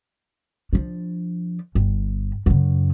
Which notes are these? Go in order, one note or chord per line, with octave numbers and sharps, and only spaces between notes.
F3 D4
G1
F#2 C#3